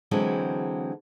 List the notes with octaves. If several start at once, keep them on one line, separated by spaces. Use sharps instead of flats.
D3 E3 F#3 G#3 C4